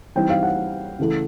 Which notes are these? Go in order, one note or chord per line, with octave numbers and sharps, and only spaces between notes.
E3 G3 C4 D#4 G5
F5
F#5
C#3 E3 A3